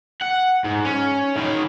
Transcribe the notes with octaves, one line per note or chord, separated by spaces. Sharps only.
F#5
G#2
C#4
D#3 G#4